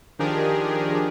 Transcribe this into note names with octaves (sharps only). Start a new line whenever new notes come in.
D#3 F3 D4 G4 G#4 A#4